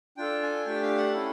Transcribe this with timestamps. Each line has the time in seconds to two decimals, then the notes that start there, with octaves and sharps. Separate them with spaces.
0.17 D4 F4 A4 G5
0.42 G#5
0.65 A3 D4 G4 G5
0.82 F5
0.98 F#5
1.14 C#4 E4 A4